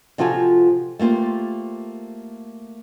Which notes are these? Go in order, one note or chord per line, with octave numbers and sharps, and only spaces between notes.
C3 F3 F4 F#4 A4 G#5
A3 A#3 F4 G4 C5